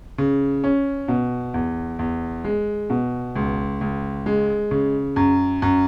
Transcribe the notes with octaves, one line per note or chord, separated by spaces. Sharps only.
C#3
C#4
B2
E2
E2
G#3
B2
C#2
C#2
G#3
C#3
F#2
F#2